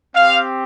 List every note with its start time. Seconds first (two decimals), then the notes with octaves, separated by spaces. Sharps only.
0.15 C4 G4 F5